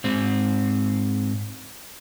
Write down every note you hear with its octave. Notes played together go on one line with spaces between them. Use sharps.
G#2 C4